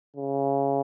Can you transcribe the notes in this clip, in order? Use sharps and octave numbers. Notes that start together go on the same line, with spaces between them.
C#3